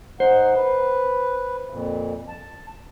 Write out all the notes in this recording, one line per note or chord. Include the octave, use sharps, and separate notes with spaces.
G#2 D#4 C5 F#5
B4
F2 A#2
A5